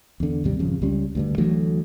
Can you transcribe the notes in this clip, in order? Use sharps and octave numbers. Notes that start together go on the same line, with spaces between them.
E2 D3
G#1 D#2 C3 G3
G#1 F2 C#3
C#2 G3 C#4
D2 G2 D3
D2 E3 F#3 A3